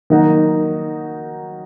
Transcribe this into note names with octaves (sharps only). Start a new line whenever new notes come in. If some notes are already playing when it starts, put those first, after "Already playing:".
D#3 F#3 A#3 D#4 F#4